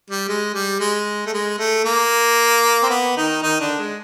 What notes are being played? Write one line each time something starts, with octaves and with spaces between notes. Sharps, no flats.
G3
G#3
G3
G#3
A3
G#3
A3
A#3
C4
B3
D#3 D#4
D#3 D#4
D3 D4
G#3